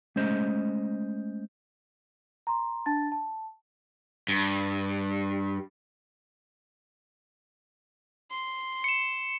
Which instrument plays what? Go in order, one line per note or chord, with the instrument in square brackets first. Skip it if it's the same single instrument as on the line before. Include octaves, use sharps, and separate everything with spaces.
[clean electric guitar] G#3 A3 C#4 C5 D#5
[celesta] A#5 C6
D4 A5 A6
A5
[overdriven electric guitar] G2
[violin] C6
[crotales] C#7 E7